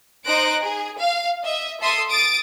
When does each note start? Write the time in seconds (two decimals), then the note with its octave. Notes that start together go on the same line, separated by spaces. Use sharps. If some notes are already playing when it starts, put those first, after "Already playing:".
0.24 D#4 C5 F#6 A#6 D7
0.62 G#4
0.98 F5
1.44 D#5 E5
1.81 A4 E5 C6 D#6
2.10 D#6 A6 D7